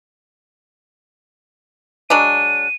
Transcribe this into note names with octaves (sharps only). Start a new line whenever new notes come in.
F#3 G#3 D4 D#7